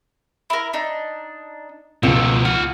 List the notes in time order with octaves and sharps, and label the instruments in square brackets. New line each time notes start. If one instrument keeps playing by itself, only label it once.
[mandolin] E4 A#4
D4 D#4
[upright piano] C#2 [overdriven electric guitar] B2 F3 [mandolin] A4
[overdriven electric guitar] F4 F#5 [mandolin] F6